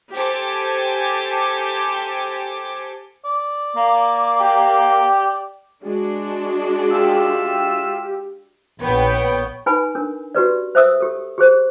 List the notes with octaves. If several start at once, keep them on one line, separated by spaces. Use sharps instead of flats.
G4 A4 C5 G#5 A5 D6
D5
A#3
G4 G5
G#3 D4 F#4
F4 G4 E5 E6
A#1 B3 C#5 G5
D#4 B4 G#5 B5
D4 A#4
F#4 G4 B4 D5
C5 E5 D#6 E6
G4 A4
G4 G#4 C5